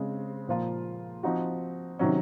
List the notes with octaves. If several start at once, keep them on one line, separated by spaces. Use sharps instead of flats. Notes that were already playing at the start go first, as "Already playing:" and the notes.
Already playing: C#3 G#3 C4
A#2 F3 A#3 F4
F3 C4 D#4 F#4
C3 D#3 F#3 C#4